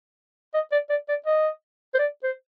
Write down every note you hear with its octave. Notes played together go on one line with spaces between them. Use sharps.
D#5
D5
D5
D5
D#5
C5
D5
C5